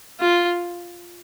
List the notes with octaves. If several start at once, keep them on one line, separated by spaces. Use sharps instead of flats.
F4